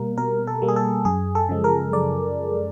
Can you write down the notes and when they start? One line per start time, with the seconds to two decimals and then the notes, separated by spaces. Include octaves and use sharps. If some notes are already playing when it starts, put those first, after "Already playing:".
Already playing: B2 G3 A#3 A#4
0.18 B2 A#4
0.47 A4
0.62 G3 A#3
0.68 G#4
0.76 A4
1.05 F#2 G#4
1.35 A4
1.49 C#3 F3 G#3
1.64 A#4
1.93 F#2 D5